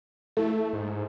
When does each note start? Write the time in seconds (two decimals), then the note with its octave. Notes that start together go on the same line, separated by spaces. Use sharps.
0.37 A3 E4 A4
0.73 G#2